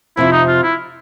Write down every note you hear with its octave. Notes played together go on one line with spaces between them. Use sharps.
F2 C3 F3 E4
D#4
F4
E4